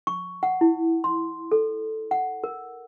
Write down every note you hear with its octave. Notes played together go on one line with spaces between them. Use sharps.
C#6
F#5
E4
C6
A4
F#5
A#4